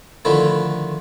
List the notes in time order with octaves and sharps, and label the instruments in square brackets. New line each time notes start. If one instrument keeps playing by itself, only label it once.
[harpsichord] D3 D#3 F3 A3 E4